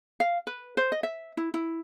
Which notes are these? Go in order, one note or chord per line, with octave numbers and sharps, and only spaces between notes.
F5
B4
C5
D#5
E5
E4
E4